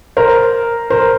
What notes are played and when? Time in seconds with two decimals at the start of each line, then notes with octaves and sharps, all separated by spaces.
0.17 A#4 C5
0.90 A#4 C5